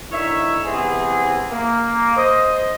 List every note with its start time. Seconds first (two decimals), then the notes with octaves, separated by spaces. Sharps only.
0.12 D3 D#3 E4 C#5 E5
0.65 C3 E3 B3 C4 G#4
1.52 A#3
2.17 C5 D#5